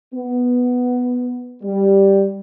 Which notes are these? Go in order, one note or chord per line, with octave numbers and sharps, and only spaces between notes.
B3
G3